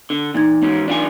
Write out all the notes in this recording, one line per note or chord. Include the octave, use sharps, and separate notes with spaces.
D3
A#2 E3 D#4 G#6
G#2 C#4
D4 F4 G#5